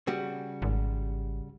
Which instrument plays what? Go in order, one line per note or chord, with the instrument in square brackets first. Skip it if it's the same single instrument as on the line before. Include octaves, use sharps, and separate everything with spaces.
[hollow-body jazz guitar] C#3 G3 F#4
[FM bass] G#1